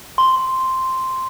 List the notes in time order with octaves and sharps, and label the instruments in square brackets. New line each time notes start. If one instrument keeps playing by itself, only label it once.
[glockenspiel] C6